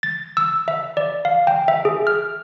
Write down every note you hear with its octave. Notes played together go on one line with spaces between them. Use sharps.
A6
E6
E5
D5
F5
G5
E5
G#4
F6